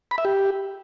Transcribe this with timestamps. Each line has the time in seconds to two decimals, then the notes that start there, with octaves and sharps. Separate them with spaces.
0.11 B5
0.18 E5
0.25 G4